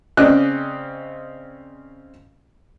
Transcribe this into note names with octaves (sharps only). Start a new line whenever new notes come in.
C#3 C4 C#4 D5 D#5 F#6